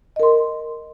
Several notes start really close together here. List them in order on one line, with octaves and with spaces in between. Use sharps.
D#5 A#4 C6